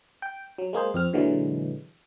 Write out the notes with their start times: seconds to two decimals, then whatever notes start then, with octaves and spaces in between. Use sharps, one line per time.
0.22 G5
0.58 F#3
0.73 G#3 A#3 G#4 C5
0.94 F2 C4 F6
1.13 A#2 D3 E3 F#3 G#3